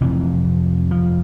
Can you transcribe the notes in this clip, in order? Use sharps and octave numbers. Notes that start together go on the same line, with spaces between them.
F2 C3 E3
F3